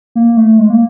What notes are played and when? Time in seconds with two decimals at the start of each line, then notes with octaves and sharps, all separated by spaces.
0.15 A#3
0.37 A3
0.59 G#3
0.70 A#3